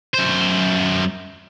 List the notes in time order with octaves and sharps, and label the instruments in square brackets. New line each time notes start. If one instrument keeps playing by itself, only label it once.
[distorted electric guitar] F#2 C5